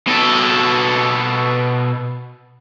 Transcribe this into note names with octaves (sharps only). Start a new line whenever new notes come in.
B2 A4